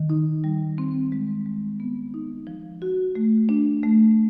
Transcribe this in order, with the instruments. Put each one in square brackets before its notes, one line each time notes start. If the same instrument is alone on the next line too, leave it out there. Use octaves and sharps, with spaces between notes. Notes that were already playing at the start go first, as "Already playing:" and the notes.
Already playing: [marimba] D#3
D#4
G3
C4
G#3
G#3
B3
D#4
F3
F#4
A3
D4
A3